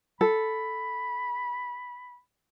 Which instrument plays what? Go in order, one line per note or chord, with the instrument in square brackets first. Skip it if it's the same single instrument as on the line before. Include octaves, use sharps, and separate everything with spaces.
[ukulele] A4 [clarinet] B5